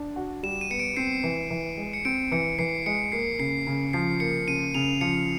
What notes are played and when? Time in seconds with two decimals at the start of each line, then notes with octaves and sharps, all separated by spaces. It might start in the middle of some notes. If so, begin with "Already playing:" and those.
Already playing: D4
0.16 F#4
0.43 G3 E7
0.61 D#7
0.71 B3 C#7
0.80 D7
0.97 C4 C7
1.24 E3
1.51 E3
1.77 G#3
1.93 C#7
2.05 C4 D7
2.32 E3 C#7
2.59 E3 C7
2.86 G#3 C#7
3.12 A#3 C7
3.39 C#3 C7
3.67 C#3
3.93 F3 C7
4.20 A#3 C#7
4.48 C#3 D#7
4.74 C#3 F7
5.01 F3 C#7